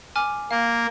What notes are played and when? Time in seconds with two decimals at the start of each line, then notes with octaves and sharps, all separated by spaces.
0.16 G#5 D6 F6
0.51 A#3 F5